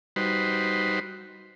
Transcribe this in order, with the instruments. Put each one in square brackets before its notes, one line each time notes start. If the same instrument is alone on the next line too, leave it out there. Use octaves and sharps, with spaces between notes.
[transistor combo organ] G3 D#4 F#4 B4 C5